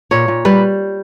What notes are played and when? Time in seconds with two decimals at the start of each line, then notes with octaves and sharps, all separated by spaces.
0.11 A#2 C#5
0.28 A#2
0.45 G3 B4